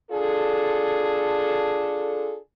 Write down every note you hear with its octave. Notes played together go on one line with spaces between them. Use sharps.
D4 F4 G#4 A4